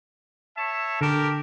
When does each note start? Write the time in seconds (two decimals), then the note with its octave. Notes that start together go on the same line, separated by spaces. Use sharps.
0.58 C#5 E5 A5
1.01 D3 G4 A#4 A5